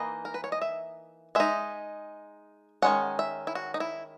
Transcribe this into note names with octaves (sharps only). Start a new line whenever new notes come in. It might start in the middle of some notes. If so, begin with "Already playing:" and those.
Already playing: E3 A#3 D#4 D#5
A#4
B4
C#5
D#5
E5
G#3 D#4 E5
D#3 G#3 C#4 F#5
E5
E4
F#4
D#4
E4